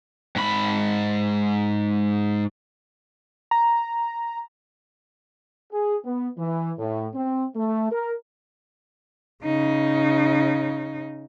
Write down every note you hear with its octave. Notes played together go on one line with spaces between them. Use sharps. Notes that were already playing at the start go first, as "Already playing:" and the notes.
G#2 B5
A#5
G#4
B3
E3
A2
C4
A3
A#4
C#3 D#4